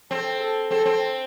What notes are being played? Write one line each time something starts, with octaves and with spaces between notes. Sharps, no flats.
C4 A4
A4
C4 A4
C4